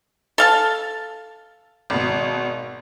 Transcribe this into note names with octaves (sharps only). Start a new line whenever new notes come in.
A4 F5 A5
G#1 B2